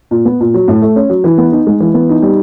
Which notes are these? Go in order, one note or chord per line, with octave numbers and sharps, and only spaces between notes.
A#2
B3
A#2
F#3
A2
A3
C#4
F#3
E3
B3
D#4
G#3
E3
B3
D#4
G3